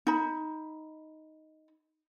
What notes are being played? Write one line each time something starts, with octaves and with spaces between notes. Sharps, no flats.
D#4 B5